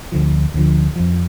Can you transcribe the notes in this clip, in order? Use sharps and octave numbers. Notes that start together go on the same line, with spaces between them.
D2 D3 F3
D2 D3 F3
F2 F3